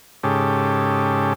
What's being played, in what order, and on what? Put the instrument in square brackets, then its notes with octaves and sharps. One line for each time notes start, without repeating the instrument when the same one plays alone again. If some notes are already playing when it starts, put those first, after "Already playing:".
[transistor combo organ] G#2 C#3 G4 A4